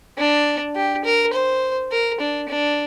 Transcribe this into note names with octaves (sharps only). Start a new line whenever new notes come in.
D4
G4
A#4
C5
A#4
D4
D4